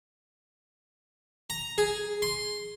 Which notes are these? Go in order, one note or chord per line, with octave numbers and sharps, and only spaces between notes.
A#5
G#4
C6